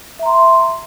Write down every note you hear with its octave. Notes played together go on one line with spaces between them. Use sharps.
E5 A#5 C6